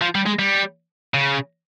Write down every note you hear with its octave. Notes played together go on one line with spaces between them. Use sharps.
F3
G3
G#3
G3
C#3